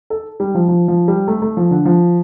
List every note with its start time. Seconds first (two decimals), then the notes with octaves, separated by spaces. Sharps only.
0.10 A4
0.40 G3
0.55 F3
0.68 F3
0.88 F3
1.08 G3
1.28 A3
1.42 A3
1.57 F3
1.71 D3
1.85 F3